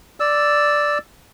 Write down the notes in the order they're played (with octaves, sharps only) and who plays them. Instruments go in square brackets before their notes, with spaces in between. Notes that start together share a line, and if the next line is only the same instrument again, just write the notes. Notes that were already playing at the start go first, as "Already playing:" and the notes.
[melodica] D5 E6